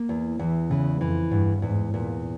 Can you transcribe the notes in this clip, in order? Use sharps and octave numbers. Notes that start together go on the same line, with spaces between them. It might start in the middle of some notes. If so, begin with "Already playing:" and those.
Already playing: A#3
E2
E2 E3
C#3 E3
F2 E3
E2 G2
E2 G#2
E2 A#2